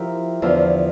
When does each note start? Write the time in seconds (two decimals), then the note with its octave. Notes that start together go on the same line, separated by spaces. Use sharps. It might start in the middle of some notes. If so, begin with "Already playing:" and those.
Already playing: F3 E4 G4 A#4
0.42 E2 D3 F3